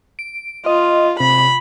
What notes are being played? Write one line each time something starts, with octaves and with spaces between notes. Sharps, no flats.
D7
F4 D#5
C3 B5